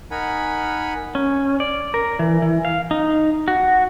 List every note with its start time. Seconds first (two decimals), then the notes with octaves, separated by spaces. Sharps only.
0.11 D#4 A#4 F#5 G#5 B5
1.15 C#4
1.60 D5
1.94 A#4
2.19 E3
2.42 E3
2.65 F5
2.91 D#4
3.48 F#4